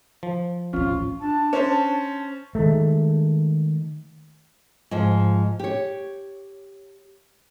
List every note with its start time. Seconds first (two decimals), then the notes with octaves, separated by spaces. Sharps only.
0.23 F3
0.73 A1 D2 C#4 F4
1.20 D4 A5
1.53 C#4 C5
2.55 D#3 G#3 A3
4.91 G#2 F3
5.59 G4 C#5